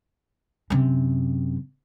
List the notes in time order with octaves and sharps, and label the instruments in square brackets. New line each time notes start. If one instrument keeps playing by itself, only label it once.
[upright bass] F#2 C3